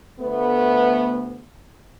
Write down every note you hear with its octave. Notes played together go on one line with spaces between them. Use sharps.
D2 A3 B3